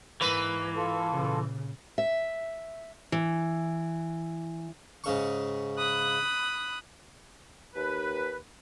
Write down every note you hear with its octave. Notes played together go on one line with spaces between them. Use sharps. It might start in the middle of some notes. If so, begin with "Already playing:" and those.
G#2 E3 A#3 B4
F4 A4
A#2 C#3
E5
E3
G#2 C#3 C#6
B5 D#6 F#6
D#2 B4